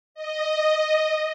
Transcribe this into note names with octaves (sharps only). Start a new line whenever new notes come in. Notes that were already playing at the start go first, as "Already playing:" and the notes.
D#5